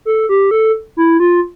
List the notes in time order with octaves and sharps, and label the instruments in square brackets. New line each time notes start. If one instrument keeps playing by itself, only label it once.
[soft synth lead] A4
G4
A4
E4
F4